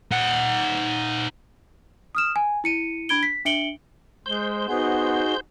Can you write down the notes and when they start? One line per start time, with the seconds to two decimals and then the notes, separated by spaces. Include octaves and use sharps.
0.11 D#4 F#5
2.15 D#6 F6 E7
2.36 G#5
2.64 E4 C#7 D#7
3.09 D4 B5 G#6 D7 G7
3.23 B6
3.45 D4 E5 C#7 D7 F#7 G7
4.26 G#3 C5 G6
4.69 B3 D#4 F#4 G#4